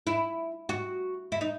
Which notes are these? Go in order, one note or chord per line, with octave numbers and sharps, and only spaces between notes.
E4
F#4
E4
D#4